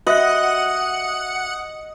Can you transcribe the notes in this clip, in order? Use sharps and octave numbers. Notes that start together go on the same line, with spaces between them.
F#4 D#5 E5 F#5 F#6